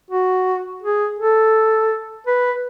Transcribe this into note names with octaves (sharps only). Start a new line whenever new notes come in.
F#4
G#4
A4
B4